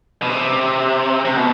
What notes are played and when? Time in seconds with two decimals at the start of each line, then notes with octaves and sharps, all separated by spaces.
0.22 B2
0.29 C3
1.25 C3
1.36 B2